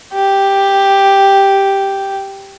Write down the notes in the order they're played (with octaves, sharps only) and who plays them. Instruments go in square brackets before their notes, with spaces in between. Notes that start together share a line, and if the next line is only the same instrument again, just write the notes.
[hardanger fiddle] G4